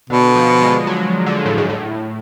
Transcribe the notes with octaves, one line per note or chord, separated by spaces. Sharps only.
B2 D3
F3
G#3
F#3
D3
A2
G#2
A2